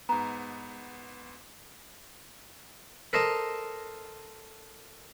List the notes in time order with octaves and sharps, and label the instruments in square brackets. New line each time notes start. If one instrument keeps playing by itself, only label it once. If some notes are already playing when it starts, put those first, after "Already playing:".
[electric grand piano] G#2 B3 [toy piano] A#5
[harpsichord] A4 A#4 C5 D#5 A5